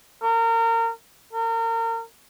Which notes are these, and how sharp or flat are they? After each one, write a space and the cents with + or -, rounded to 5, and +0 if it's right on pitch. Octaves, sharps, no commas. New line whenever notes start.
A#4 -30
A#4 -35